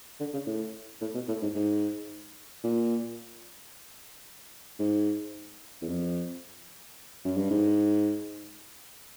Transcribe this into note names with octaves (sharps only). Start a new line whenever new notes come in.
D3
C#3
A2
A2
B2
A2
G#2
G#2
A#2
G#2
E2
F2
F#2
G2
G#2